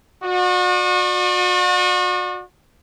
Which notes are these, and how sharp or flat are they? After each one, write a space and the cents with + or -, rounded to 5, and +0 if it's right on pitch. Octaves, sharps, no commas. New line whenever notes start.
F#4 -35 D5 +30